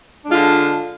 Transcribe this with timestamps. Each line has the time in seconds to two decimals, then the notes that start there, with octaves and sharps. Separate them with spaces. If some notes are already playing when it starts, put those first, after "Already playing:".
0.25 D4
0.28 G#3
0.31 F4
0.34 D3